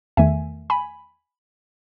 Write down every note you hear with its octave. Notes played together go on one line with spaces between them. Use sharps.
E2 D#3 A3 E5 G#5
G#5 B5